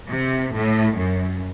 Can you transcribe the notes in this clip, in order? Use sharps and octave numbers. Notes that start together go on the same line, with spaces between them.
C3
A2
F#2